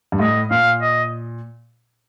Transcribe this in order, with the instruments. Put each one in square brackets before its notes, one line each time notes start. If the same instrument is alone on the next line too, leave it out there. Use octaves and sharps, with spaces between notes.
[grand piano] G2
[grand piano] A2 [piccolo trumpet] D#5
[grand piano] A#2 [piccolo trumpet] F5
[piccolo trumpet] D#5